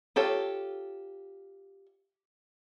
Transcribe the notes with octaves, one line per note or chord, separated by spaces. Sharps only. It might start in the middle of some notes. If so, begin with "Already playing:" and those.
F4 G4 A4 C#5